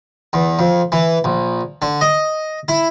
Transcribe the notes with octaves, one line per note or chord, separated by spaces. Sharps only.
E2
F2
E3
A#1
D3
D#5
E4